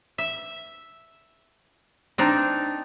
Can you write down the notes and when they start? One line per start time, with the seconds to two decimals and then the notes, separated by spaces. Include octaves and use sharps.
0.18 E5
2.18 C4 D4 D#4